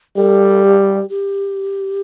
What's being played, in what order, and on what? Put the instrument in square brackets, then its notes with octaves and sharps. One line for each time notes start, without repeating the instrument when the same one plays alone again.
[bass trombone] G3 [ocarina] A4
[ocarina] G4
G4